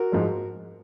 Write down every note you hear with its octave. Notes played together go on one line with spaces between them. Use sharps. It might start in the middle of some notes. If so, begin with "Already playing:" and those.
Already playing: F#4 A#4
G#2 F3 G#3